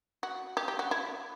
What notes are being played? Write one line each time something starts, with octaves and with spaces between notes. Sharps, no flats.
F#4
G4
G4
F#4
E4